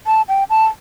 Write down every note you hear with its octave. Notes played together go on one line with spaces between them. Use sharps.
A5
G5
A5